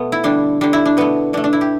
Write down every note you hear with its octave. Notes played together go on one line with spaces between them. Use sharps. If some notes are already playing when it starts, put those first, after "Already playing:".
Already playing: B2 A3 B3
E4
D3 G3 D4
D3 G3 D4
E4
D4
B2 A3 B3
B2 A3 D4
D4
E4
G4